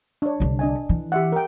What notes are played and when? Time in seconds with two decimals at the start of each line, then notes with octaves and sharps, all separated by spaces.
0.22 D4 C#5
0.40 C2 D3
0.59 D4 D#5 G#5
0.89 E3
1.12 G4 E5 F#5
1.32 A#4 G5